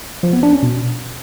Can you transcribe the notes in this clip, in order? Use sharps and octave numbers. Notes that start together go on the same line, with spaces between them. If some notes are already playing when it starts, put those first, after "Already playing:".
F3
B3
D4
C#4
B2